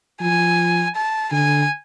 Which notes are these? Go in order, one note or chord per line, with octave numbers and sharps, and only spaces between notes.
F3 G#5
A5
D3 G#5